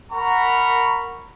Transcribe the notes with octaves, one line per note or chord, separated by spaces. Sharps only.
A#4 F#5 A#5 B5 C#6